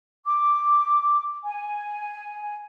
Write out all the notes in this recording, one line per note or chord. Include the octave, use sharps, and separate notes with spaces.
D6
G#5